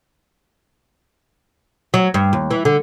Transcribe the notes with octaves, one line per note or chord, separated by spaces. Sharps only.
F#3
G2
D#2
E3
D3